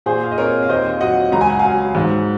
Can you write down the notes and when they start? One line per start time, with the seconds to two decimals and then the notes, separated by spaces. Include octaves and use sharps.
0.06 A#2 G#4 C5
0.24 F5
0.31 D#5
0.38 C4 A#4 C#5
0.63 F5
0.69 D#2 C5 D#5
1.00 F#3 D#5 F#5
1.32 C#2 A#5
1.41 G#5
1.50 F#5
1.59 F#3 F5 G#5
1.95 G#2